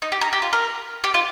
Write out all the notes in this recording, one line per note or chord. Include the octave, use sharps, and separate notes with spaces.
D#4
G4
A#4
G4
F4
A#4
G4
F4